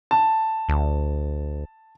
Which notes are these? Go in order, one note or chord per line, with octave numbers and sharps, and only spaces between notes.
A5
D2